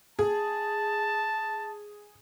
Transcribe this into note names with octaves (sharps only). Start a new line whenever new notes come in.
G#4 A5